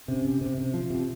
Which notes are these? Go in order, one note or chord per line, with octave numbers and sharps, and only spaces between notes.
C3 C#4
C3
C3
C3
F3
C3